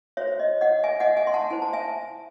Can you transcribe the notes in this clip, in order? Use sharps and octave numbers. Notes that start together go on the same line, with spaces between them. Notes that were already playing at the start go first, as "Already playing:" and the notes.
F#4 C5 C#5 E5
D#5
D#5 F#5
E5 G#5
D#5 F#5
E5 G#5
C6
F#5 A5
E4 C5 G#5
A5
E5 G#5